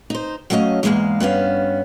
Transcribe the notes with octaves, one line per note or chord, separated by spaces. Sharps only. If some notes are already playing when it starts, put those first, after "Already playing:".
D#4 C5
F#3 A3 C#4 D#5 F5
E2 G#2 G#3 A#3 F5
G2 B3 C#4 F5